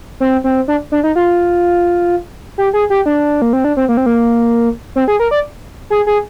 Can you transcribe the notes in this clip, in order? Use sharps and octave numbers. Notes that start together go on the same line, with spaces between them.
C4
C4
D4
D4
D#4
F4
G4
G#4
G4
D4
A#3
C4
D4
C4
A#3
C4
A#3
C4
G#4
A#4
D5
G#4
G#4